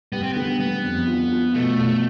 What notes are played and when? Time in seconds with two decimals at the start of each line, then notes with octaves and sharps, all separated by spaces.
0.12 G3 B3
0.23 C4
0.33 D3 B3
0.59 G3 B3
0.83 F2
1.07 F4
1.31 F4
1.54 B2 A3
1.78 B2